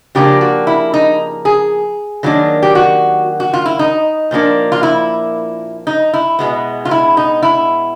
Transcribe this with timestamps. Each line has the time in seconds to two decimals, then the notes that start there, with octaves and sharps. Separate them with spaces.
0.15 C#3 F3 A#3 D4 G4
0.41 F#4
0.67 E4
0.94 D#4
1.45 G#4
2.23 D#3 F#3 A#3 D4
2.63 G4
2.75 F#4
3.40 F#4
3.54 F4
3.66 E4
3.79 D#4
4.31 A#2 F3 A#3 D4
4.72 F4
4.83 E4
5.87 D#4
6.14 E4
6.39 B2 G#3 B3
6.85 F4
6.91 E4
7.17 D#4
7.43 E4